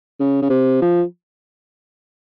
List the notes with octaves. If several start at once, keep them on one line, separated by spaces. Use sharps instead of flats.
C#3
C#3
C3
F3